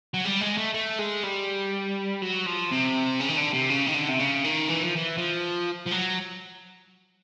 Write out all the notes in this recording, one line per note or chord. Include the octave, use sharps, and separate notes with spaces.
F#3
G3
G#3
A3
A3
G#3
G3
F#3
F3
C3
C#3
D#3
D3
C3
C#3
D#3
D3
C3
C#3
D#3
E3
F3
E3
F3
F3
F#3